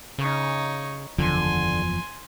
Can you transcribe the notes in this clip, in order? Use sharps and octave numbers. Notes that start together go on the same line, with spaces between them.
C#3 D#4 C#5
F#1 E2 D3 F3 G#5 C6